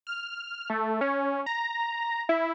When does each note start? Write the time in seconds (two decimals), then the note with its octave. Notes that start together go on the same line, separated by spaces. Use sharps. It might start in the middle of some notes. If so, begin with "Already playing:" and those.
0.07 F6
0.70 A3
1.01 C#4
1.46 A#5
2.29 E4